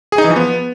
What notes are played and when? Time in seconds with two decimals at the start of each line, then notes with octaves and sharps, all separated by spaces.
0.12 G#4
0.18 D#4
0.24 E3
0.30 F3
0.36 B3